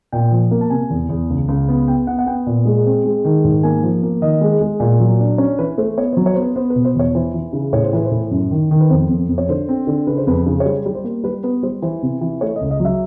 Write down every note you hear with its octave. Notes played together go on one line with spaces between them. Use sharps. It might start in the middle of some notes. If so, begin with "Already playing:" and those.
A#2 G5
F3
A#3
A5
C3 G#5
E2
E2
C#2
C#2
B3
B3 G5
B3 F#5
F#5
B3 G5
A#2
G#3
C4
G#3
D#3
G#2
A#3 G#5
F3
A#3
D#3 D#5
G#3
G#3
A#2
F#3
D4
C#4 C#5
E3 B4
A3 C5
B3 C#5
C5
F#3
C#5
C5
B3
B4
B3 C5
B4
B2
C5
E2 C#5
E3 C5
E3
C#3
A2 C#5
C5
E3 B4
C5
A2
F#2
D#3
D#3
B4
F2 C5
F2
F2
C#5
D3 C5
C4
D3
C#3 B4
C5
F2 B4
C#3
C#5
G3 C5
G3
C5
A#3
G3 B4
B3 B4
G3 C5
E3 C5
C3
E3
A3 C#5
D#5
C#2
D#5
F#3 E5